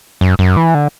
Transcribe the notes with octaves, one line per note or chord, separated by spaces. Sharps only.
F#2
F#2
E3
D3